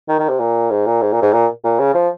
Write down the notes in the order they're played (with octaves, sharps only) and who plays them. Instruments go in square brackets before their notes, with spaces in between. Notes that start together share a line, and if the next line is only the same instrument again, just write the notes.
[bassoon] D#3
D#3
C3
A#2
G#2
A#2
G#2
A#2
G#2
A#2
A#2
C#3
F3